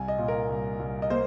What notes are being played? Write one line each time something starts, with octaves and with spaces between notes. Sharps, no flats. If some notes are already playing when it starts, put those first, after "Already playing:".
Already playing: C2 G#5
D#5
A#2
A#4
C2
C2
D#5
A#3 C5